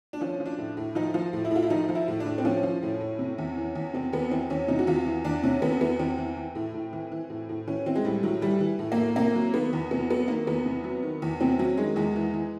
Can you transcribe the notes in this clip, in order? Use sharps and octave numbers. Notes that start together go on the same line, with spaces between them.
D4
F3 C#4
F3
D4
A2
A2
F3 D#4
F3
A2
E4
A2 F4
E4
F3 D#4
F3
E4
A2
D4
A2
C4
F3 C#4
F3
A2
A2
C3
E2
E3
E2
C3 C4
E2 B3
E3 C4
E2 C#4
C3 D#4
F#4
E2 F4
E3
E2 D4
C3 C#4
E2 B3
E3 B3
E2 C4
E3
E3
A2
A2
E3
E3
A2
A2
E3 C#4
E3 C4
G#3
A2 G3
A2 F#3
E3 G3
E3
A2
A#3
A2
C3 A#3
F#3
D#3 B3
E2
C3 B3
F#3 B3
D#3 A#3
E2 B3
C3
F#3
D#3
E2
C3 C4
F#3 C#4
D#3 G#3
E2 G#3
E3
E3